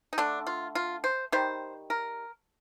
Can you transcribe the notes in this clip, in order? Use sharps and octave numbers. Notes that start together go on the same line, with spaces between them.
D#4
D3 A3 D4
F4
F4
C5
D#3 G3 C5
A#4